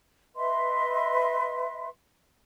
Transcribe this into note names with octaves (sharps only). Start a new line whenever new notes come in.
B4 D#5 E5 C6